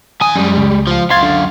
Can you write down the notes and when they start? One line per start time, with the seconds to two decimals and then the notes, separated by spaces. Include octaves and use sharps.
0.21 D#3 G#5 D#6
0.35 F#2 G3 G#3
0.58 C#2
0.87 F3 F4
1.10 F#2 F5 C6 G#6 A6
1.23 D3